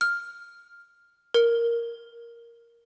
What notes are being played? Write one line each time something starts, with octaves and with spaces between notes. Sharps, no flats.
F6
A#4